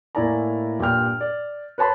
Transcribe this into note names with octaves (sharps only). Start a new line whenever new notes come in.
A2 A#3 E4 D5 G#5 A#5
G2 A#2 G3 G5 F6
D5
B4 C#5 A5 B5 C6